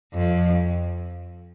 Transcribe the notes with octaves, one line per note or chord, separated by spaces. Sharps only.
F2